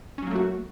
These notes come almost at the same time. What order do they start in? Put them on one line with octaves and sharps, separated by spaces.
C#4 F#3 A#3 A3 F#4